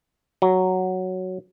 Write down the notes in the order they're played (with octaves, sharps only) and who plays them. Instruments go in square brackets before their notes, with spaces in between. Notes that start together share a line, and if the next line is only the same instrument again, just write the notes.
[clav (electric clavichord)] F#3